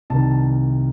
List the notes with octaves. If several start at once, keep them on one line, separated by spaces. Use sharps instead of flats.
C2 C3 D#3 A5